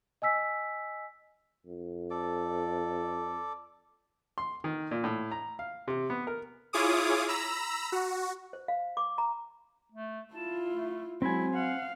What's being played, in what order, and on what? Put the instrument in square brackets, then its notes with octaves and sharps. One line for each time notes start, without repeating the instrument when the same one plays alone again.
[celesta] D#5 G#5 E6 B6
[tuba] F2
[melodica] A4 D5 D6
[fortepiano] C6
D#3
A#2
A2
A#5
F5
C3
B3
A#4
[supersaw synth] E4 F4 G#4 C#5 D6 D#6
A#5 B5 E6
F#4
[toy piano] C5
F5
D6
A#5
[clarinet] A3
[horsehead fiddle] E4 F4 [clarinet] A5
[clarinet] A3
[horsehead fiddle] F#3 G#3 [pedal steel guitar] C4 G#5 [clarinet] E4
[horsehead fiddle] F5 [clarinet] F#5